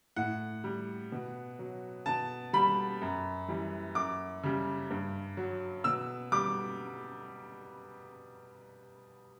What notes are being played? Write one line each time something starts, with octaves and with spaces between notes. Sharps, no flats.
A2 F#5
G3
B2
F#3
B2 A5
G3 B5
F#2
E3 G3
F#2 D6
C#3 G3
G2
F#3
B2 E6
G3 D6